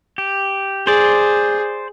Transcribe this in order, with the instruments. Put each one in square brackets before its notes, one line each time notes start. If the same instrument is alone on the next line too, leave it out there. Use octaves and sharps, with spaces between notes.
[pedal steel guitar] G4
[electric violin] G#4 [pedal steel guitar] C5 D5